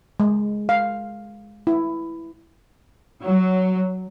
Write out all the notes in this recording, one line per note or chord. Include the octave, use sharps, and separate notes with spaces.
G#3
F5
E4
F#3